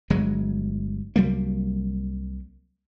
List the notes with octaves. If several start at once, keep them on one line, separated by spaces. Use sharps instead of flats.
G1 F#3 G#3
C2 F#3 G3 A#3